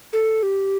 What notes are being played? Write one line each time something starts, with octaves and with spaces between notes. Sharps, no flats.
A4
G4